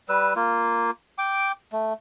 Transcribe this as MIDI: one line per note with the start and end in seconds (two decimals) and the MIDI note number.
0.09 0.33 55
0.09 0.33 71
0.09 0.33 88
0.36 0.91 58
0.36 0.91 65
1.18 1.52 79
1.18 1.52 86
1.73 1.93 57